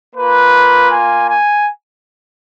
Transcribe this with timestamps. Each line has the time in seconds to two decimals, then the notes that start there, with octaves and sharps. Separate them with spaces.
0.16 A#3 F4 B4
0.91 G#5
1.30 G#5